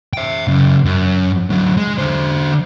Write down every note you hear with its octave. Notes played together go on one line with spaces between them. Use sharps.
E5 G5
F#2 C#3
F#2
D3 F#3
G#3
D3 C5